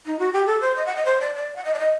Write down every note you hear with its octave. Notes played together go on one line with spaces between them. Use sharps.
D#4
F#4
G4
A4
C5
D#5
F#5
D#5
C5
D5
D5
F#5
D#5
D5
D#5